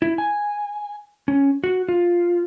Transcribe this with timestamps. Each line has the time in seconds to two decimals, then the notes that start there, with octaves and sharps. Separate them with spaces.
0.02 E4
0.18 G#5
1.28 C#4
1.64 F#4
1.89 F4